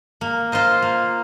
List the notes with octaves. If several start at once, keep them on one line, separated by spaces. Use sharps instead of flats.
A#3
F4 C5 D#5
A#3